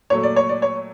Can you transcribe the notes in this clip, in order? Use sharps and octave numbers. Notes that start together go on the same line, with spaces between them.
A#2 F#3 A3 C#5
D5
C#5
D5
C#5